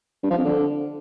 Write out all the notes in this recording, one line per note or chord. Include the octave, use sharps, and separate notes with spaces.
G2
F3
F2
D3